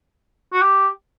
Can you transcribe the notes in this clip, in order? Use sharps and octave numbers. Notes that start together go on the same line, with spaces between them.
F#4
G4